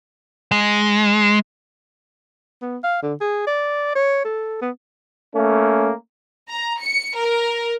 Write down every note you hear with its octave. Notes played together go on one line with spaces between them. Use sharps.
G#3
B3
F5
D3
G#4
D5
C#5
A4
B3
A3 A#3 C#4
A#5
C#7
A#4